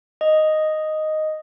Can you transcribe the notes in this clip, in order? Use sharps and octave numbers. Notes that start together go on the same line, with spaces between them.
D#5